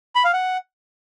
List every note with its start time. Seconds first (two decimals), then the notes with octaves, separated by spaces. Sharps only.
0.15 B5
0.24 F5
0.33 F#5